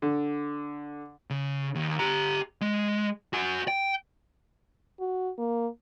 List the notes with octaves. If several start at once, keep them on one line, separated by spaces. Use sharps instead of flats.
D3
C#3
D#2
G4 A#5
G#3
F#4 G#5
G5
F#4
A#3